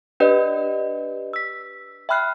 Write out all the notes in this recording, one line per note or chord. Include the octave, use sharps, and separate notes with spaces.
D4 G4 B4 D5 D#5
E6 B6
E5 G5 B5 F6 F#6 C7